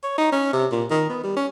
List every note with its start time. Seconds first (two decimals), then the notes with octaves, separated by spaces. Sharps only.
0.03 C#5
0.18 D#4
0.32 C#4
0.53 C3
0.72 A#2
0.90 D#3
1.09 B3
1.24 G3
1.36 C#4